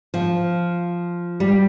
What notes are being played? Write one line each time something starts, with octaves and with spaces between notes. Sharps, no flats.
F3
G3